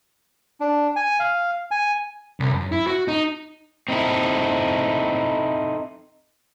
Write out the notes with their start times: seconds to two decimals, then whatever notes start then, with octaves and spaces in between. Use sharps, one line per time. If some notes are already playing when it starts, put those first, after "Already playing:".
0.60 D4
0.96 G#5
1.20 F5
1.71 G#5
2.40 C2
2.53 F#2
2.72 E4
2.87 F#4
3.08 D#4
3.88 C4 D#4 E4 A4